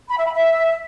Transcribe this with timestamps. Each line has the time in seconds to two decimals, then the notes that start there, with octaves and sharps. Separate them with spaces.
0.10 B5
0.18 E5
0.26 B5
0.33 E5